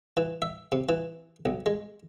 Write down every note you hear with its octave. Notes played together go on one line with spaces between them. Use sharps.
E3
E5
C3
E3
B1
G#3